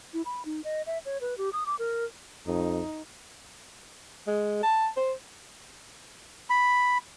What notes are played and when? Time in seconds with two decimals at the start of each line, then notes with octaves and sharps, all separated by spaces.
0.14 E4
0.25 B5
0.45 D#4
0.64 D#5
0.86 E5
1.05 C#5
1.21 B4
1.38 G4
1.53 D#6
1.66 D6
1.79 A#4
2.47 F2 D#4
4.27 G#3
4.63 A5
4.97 C5
6.50 B5